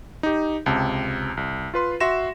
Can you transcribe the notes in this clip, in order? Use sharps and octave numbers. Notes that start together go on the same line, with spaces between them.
D#4 G4
C#2 C3 A5
C2
F4 B4 C6
F#4 E5 C6 A#6 E7